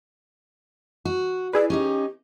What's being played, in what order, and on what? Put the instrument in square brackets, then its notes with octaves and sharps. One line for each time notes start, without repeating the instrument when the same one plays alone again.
[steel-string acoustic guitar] F#4
[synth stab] E4 G#4 B4 [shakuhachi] D5
[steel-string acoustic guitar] C#4 D#4 D#5 [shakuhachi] G4